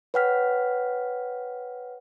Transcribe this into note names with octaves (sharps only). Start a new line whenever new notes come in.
B4 C#5 F#5 G5 F6 B6